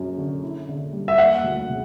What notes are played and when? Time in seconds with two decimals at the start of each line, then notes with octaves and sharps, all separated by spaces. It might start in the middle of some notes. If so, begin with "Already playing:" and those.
Already playing: F#2 C#4
0.18 D3
0.43 E4
0.68 D3
0.93 G3
1.08 E5
1.18 A#3 F#5
1.44 D2
1.69 C#3